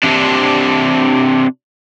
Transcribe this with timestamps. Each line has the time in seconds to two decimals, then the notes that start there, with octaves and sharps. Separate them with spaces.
0.03 C3 D4